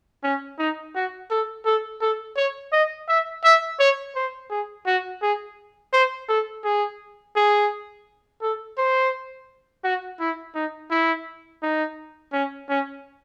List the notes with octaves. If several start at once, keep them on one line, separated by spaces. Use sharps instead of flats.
C#4
D#4
F#4
A4
A4
A4
C#5
D#5
E5
E5
C#5
C5
G#4
F#4
G#4
C5
A4
G#4
G#4
A4
C5
F#4
E4
D#4
E4
D#4
C#4
C#4